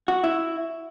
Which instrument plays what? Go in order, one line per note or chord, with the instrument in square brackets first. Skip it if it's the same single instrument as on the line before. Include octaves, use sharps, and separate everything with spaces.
[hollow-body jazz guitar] F#4
E4